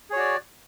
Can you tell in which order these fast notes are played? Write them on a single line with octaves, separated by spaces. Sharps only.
G#4 C#5 F#4 D5